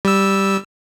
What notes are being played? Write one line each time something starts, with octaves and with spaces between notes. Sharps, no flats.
G3 E6